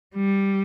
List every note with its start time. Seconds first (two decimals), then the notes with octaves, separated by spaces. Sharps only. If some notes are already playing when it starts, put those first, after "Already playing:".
0.15 G3